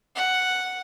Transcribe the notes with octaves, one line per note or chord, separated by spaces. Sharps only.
F#5